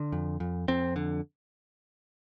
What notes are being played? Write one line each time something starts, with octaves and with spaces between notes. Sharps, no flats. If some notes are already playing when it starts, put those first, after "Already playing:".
Already playing: D3
F2
F2
F2 C4
D3